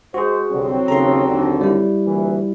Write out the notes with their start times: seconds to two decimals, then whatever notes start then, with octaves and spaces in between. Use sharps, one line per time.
0.14 G#3 F#4 G#4 C5
0.52 C2 D3 F#3 C4
0.88 D#2 C#3 A4 A#5 C6
1.27 D#2 D3
1.61 G3 E4
2.05 D2 A#2 E3